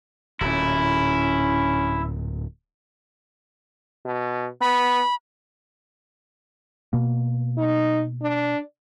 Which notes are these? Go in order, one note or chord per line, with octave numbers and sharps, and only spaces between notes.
D1 A#2 C#4 E4
B2
B3 B5
B2 A#3
D#4
D4